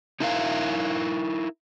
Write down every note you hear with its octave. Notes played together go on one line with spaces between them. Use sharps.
D#4 E4 A#4 E5 F5